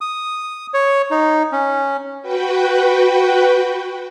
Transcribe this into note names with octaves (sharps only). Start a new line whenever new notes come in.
D#6
C#5
D#4
C#4
F#4 B4 G5